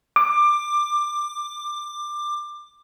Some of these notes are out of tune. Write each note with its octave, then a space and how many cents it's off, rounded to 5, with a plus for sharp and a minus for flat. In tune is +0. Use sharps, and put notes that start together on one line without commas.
D6 +20